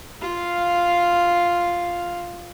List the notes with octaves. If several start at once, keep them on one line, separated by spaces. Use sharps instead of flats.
F4 F5